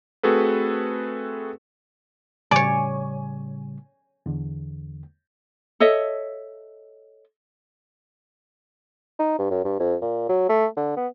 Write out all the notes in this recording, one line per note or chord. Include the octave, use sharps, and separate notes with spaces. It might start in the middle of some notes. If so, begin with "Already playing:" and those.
A3 C4 F#4 G#4 A4 B4
A2 C#3 G3 C#5 D5 G#5
E2 D3
A4 C#5 D#5 E5
D#4
G2
F#2
G2
F2
A#2
F#3
A3
D3
B3